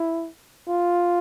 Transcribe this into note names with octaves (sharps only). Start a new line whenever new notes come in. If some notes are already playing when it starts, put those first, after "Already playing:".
Already playing: E4
F4